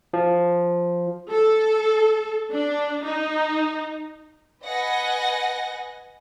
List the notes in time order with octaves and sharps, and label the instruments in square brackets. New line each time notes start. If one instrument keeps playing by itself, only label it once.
[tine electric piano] F3
[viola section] A4
D4
D#4
[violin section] B4 D#5 F#5 G#5 A#6